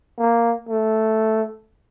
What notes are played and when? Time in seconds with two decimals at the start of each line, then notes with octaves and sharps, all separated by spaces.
0.19 A#3
0.69 A3